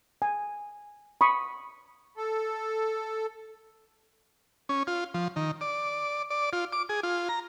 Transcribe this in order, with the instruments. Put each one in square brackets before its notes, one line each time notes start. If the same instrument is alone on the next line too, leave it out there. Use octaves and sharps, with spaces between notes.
[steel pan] G#5
B5 C#6 D#6
[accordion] A4
[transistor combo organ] C#4
F4
F3
D#3
D5
D5
F4
D6
G#4
F4
A#5